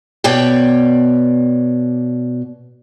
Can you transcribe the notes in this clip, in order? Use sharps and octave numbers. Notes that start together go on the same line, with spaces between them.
B2 C#5 D5 G5